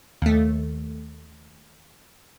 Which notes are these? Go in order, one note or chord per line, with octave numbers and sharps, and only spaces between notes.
D#2 A3